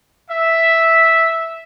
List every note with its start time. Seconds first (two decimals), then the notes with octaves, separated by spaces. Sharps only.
0.30 E5